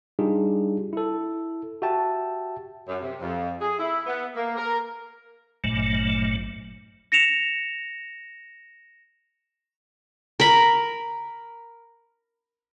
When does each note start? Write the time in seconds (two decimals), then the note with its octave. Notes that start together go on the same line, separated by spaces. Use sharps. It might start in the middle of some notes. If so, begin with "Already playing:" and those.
0.19 G3 D4 D#4 F4 G4 G#4
0.93 E4 A4
1.82 F#4 G4 E5 G5 A5
2.88 F#2
3.01 C3
3.21 F2
3.61 G#4
3.79 E4
4.07 B3
4.36 A#3
4.57 A#4
5.64 G#1 G2 A#2 F#3 A3
7.12 A#6 C#7 E7 F7
10.40 A#4 B5